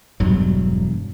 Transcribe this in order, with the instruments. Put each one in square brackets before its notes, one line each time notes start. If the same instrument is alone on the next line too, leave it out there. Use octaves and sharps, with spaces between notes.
[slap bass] E1 G2 F#3